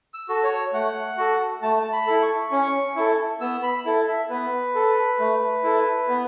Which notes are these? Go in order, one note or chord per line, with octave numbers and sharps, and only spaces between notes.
E6
F#4 A4
C#5
A3 F#5
F#4 A4
A3 A5
B5
E4 A4
C#6
C#4
E4 A4
B3 E6
B5
E4 A4
E5
B3 B4
A4
A3
E4 A4
B3